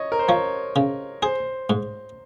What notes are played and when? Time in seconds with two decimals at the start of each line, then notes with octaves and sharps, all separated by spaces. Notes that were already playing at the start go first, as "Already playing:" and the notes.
Already playing: C#5 D#5
0.12 A#4
0.19 C5
0.28 F3 C#5
0.76 C#3
1.22 G#4 C5
1.70 G#2